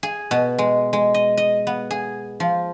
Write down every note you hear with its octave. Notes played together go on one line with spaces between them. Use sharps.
G#4
B2
G#3
G#3
D#5
D#5
B3
G#4
F3